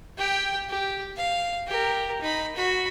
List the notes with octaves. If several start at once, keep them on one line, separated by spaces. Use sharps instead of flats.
G4 G5
G4
F5
G4 A#4
D#4 B5
F#4 B5